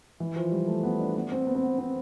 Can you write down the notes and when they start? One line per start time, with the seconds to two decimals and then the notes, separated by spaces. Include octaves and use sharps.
0.20 E3
0.36 F3
0.51 G3
0.67 A3
0.83 B3
1.00 D4
1.15 B3
1.32 C4
1.47 B3
1.55 C4
1.63 B3
1.79 C4